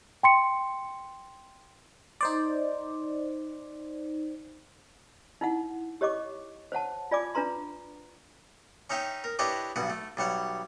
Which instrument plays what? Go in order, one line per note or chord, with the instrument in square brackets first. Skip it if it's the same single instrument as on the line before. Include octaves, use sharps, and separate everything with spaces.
[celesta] G5 C6 C#7
[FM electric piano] D#4 C5 D5
[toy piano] D#4 E4 F#5
G4 C#5 D#5 C#6 D6
C5 C#5 F#5 A5
F4 D5 G#5 D6
D4 F4 B4 A#5 C6
[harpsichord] C#4 D#4 C#5 E5 G5
A#4
D4 E4 G4 B4 C#5 D#5
B1 G2 B2 F#5
A3
B1 G3 C#5 F#5